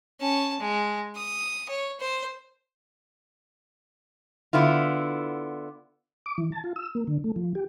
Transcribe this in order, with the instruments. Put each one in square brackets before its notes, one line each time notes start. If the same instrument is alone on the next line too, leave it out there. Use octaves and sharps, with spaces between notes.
[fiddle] C#4 A5
G#3
D#6
C#5
C5
[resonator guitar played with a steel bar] D3 B3 E4 F4
[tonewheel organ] D6
E3
A5
F4
E6
A#3
D3
A3
F3
G4